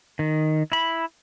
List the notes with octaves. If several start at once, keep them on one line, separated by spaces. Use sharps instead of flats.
D#3
E4 B5